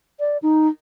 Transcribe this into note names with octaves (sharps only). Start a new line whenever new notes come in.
D5
D#4